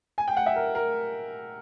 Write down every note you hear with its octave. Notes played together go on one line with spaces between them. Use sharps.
G#5
G5
F#5
E5
A#4
A#4